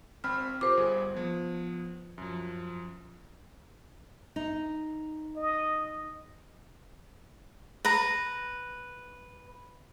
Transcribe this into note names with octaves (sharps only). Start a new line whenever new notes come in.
G#1 C4 B5 F6
F4 G4 A#4 C5 D6
G1 G3 G#4
F3 B3
F#2 F3
D#4
D#5
B4 A#5